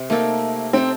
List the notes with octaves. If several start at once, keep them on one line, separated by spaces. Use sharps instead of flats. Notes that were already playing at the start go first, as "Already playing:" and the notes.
Already playing: C3
A3 A#3 D#4 A4
A3 C4 D#4 A4